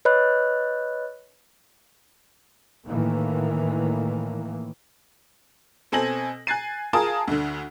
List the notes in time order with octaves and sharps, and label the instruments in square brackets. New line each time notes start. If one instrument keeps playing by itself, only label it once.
[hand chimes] B4 C#5 D#5 B5 F#6
[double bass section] A2 D#3 E3 A#3
[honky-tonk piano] B2 C4 A4 G#5 A#6 F#7
G#5 F#6 G#6 A6 C7 D#7
F4 G#4 A#4 G#5 A5 D#6
D2 D3